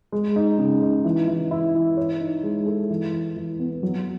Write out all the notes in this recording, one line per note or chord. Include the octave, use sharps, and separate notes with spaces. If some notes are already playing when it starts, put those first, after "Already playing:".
G#3
D#4
C#3
D#4
E3
E3
E4
E3
C#5
D#4
G#3
A4
E3
E3
E3
B3
F#3